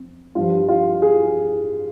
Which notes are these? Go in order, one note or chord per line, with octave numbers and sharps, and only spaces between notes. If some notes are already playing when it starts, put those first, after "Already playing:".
Already playing: F2
G2 F3 F4
F4
G#4